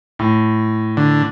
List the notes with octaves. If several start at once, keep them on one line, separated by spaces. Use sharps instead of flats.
A2
D3